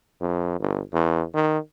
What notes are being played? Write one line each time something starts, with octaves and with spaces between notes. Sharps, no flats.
F2
G1
E2
D#3